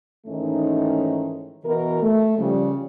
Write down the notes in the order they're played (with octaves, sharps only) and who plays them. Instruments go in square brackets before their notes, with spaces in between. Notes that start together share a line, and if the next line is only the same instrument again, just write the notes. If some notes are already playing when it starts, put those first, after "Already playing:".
[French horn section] G#2 D#3 E3 A3 C#4 D#4
B2 E3 A#4
A3
C#3 F3 G3